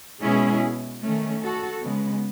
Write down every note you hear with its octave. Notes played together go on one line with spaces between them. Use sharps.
B2 G#3 C#4 E4 G#4
D#3 A3 C#4
F#4 A4
C#3 G#3 B3